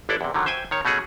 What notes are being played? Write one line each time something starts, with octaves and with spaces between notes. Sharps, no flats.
G1 D4 E4 A4 D5
E2 C3
D3 D#3 F#3
C5 E5 G5 G#5
D#3 C#5
B2 A3 C#4 F#4 G#4